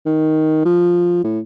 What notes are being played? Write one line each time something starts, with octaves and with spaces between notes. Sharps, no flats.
D#3
F3
A2